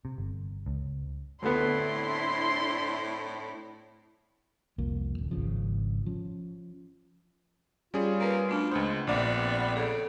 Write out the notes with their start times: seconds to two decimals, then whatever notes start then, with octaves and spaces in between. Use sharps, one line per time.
0.05 C3
0.18 G1
0.66 C#2
1.42 D2 A2 A3 B3 C4 D4 E4 C6
4.78 C2 F2 A#3
5.18 D1
5.31 G#1 C#3 F3
6.06 F3 C#4
7.94 G3 C#4 F4 G#4 D5
8.20 A#3 A#4 B4
8.49 B2 A3 D4 F6
8.71 C#2 G#3 B3 C5 D#6
9.07 A#1 B3 C4 D5
9.76 C#3 A4